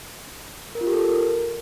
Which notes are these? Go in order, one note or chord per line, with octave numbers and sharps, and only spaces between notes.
A#4
F4
G4
A4
A#4